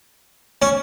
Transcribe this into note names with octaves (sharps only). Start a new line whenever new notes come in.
C#4